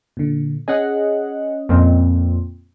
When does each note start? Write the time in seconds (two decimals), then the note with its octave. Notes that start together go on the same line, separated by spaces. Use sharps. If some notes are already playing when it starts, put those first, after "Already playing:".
0.17 A#2 D3
0.68 C#4 G#4 D#5 F#5
1.69 F2 A#2 C4